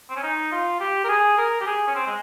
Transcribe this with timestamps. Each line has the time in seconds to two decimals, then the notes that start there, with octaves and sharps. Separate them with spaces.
0.09 C4
0.16 C#4
0.23 D#4
0.52 F4
0.80 G4
1.04 A#4
1.09 G#4
1.37 A#4
1.61 G4
1.66 G#4
1.87 C#4
1.95 C4
2.06 G#3